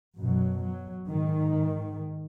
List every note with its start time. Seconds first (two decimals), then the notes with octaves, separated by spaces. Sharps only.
0.17 F#2 B2 F#3
0.62 F#3
1.08 G#2 D#3